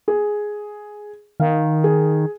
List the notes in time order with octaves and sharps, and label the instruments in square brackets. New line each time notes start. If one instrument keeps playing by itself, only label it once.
[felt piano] G#4
[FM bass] D#3 [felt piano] F5
[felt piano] G#4